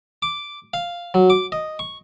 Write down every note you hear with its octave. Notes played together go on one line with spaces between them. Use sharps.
D6
F5
F#3
D6
D#5
C#6